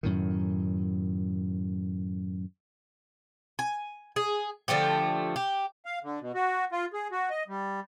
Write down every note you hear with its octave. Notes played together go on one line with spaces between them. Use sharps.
F#2 A2 D#3
G#5
G#4
D3 F3 A3 G4
G4
F5
D3
B2
F#4
F4
G#4
F#4
D#5
G3